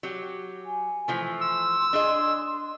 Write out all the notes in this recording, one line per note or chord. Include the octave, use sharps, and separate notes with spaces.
F#3 G4
G#5
E3 F3 A3
C6 E6
D4 G#4 D#5